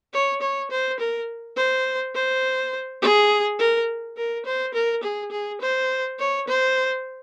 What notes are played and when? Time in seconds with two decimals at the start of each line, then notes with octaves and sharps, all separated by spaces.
0.13 C#5
0.41 C#5
0.71 C5
0.99 A#4
1.57 C5
2.15 C5
3.02 G#4
3.59 A#4
4.17 A#4
4.45 C5
4.74 A#4
5.03 G#4
5.31 G#4
5.61 C5
6.19 C#5
6.48 C5